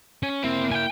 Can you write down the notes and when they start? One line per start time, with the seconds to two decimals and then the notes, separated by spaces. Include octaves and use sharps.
0.23 C#4
0.44 A#3 C4 E4
0.71 G5 G#5